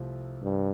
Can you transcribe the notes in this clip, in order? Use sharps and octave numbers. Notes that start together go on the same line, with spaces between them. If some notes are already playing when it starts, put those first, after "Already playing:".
Already playing: C2 C3 F3 A3
G2